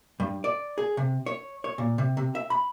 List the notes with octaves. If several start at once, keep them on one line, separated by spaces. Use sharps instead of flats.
G2
D5
G#4
C3
C#5
C#5
A#2
C3
C3
E5
B5